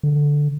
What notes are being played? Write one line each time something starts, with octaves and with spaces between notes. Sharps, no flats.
D3